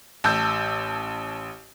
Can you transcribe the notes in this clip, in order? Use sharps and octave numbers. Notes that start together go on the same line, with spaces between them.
A1 A5 E6 G6